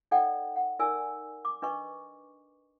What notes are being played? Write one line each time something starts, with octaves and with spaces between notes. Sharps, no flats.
D#4 A4 D5 D#5 F#5 G5
F#5
D#4 A#4 D5 G#5 E6
D6
D4 B4 D#5 C#6